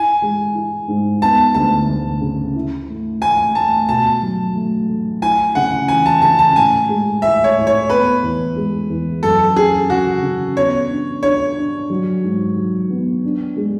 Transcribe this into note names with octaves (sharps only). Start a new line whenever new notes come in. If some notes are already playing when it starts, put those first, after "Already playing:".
Already playing: E4 G#5
G#3
E4
G#2
B3 A5
D2 A5
D2
C#3
E4
A3
A3 G#5
A3 A5
B2 A5
F#3
A3
A3
E4 G#5
C#3 F#5
E3 G#5
A5
C#3 A5
A5
A2 G#5
G#3
A2 E5
C#5
A2
C#5
B3 B4
E2
G#3
E2
F#2 A4
C#4 G#4
C#3 F#4
C#3
B3 C#5
D4
D4 C#5
D4
F#3
G#2
F#3
B3
D4
G#3